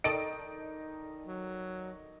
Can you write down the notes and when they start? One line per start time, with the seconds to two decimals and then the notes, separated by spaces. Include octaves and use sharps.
0.04 D#3 D#4 A4 D5 D#5 D7
1.27 F#3